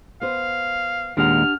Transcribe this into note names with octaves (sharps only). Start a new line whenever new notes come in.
B3 C5 F5
D#2 A#2 G#3 D4 G4 F#5 F6